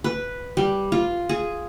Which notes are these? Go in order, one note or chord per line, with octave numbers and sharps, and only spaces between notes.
B4
G3
F4
G#4